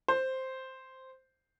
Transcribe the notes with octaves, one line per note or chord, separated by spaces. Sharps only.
C5